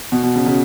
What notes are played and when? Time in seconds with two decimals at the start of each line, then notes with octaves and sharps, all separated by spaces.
0.12 B2
0.23 B2
0.36 C#3
0.46 C#3